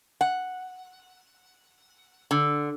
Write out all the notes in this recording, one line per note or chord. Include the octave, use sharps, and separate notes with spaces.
F#5
D3